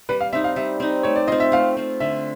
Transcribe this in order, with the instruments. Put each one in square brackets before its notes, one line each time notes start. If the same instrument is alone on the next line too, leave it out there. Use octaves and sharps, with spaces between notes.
[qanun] G3 [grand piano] B4
[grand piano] F5
[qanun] C4 D#4 [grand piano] E5
[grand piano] F5
[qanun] G3 [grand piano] E5
[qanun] C4 D#4
[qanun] A3 [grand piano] C#5
[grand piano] D5
[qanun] C4 F4 [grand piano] D#5
[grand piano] E5
[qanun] A3 [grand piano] F5
[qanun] C4 F4
[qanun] D3 [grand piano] E5